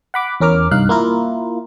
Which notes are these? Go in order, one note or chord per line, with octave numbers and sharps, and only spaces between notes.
F#5 B5 D6
E2 C#4 A#4 D6 F6
C2 G2 D#4 F5 F#6
A#3 E4 F4 A#4